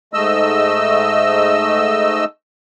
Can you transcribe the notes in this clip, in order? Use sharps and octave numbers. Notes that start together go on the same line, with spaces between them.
G#2 A3 D#5 E6